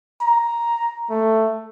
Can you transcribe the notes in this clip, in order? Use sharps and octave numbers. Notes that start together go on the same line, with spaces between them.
A#5
A3